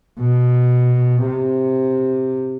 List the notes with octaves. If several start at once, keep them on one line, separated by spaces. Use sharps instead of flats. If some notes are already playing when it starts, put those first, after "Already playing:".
B2
C3